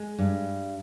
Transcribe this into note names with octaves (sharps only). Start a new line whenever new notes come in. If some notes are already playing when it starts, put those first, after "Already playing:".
Already playing: G#3
G2